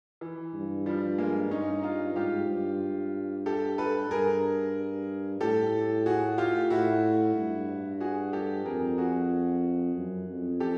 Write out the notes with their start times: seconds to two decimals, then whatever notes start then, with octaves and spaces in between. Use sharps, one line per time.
0.21 E3
0.54 G2
0.86 F3 G3
1.18 G#3 A#3
1.51 G2 C#4 D#4
1.83 D#4 F4
2.16 G#2 F4 G4
2.48 G2
3.46 G4 A4
3.78 A4 B4
4.10 G2 G#4 A#4
5.41 A2 G4 A4
6.06 F#4 G#4
6.38 F4 G4
6.70 A2 E4 F#4
7.35 G2
8.00 F#4 G#4
8.33 G4 A4
8.65 F2 G#4 A#4
8.98 F#4 G#4
9.96 F#2
10.28 F2
10.60 G4 A4